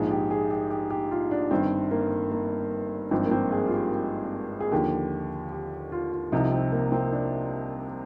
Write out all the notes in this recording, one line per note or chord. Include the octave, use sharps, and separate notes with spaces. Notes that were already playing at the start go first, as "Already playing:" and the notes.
Already playing: A#1 G#2 F3 G#4
G4
G#4
G4
G4
G4
F4
D4
G1 G2 D#3 C4
A#3
A#3
G#1 G2 F3 C4
A#3
C4
G#4
F4
G4
G#4
D#2 D3 F3 G4
G4
F4
F4
C2 C3 F3 D#4
C4
A#3
C4
D4